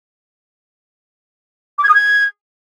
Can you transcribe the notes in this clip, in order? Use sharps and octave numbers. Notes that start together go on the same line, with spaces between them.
D6
G#6
D#6
G#6